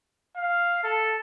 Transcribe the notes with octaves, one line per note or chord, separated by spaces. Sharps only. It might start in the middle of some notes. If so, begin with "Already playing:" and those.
F5
A4